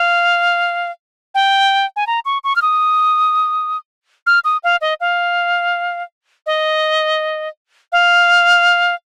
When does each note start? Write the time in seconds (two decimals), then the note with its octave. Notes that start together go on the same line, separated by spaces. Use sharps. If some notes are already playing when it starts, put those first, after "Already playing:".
Already playing: F5
1.35 G5
1.96 G#5
2.07 A#5
2.25 C#6
2.44 C#6
2.56 F6
2.62 D#6
4.26 F6
4.44 D#6
4.63 F5
4.81 D#5
5.00 F5
6.46 D#5
7.92 F5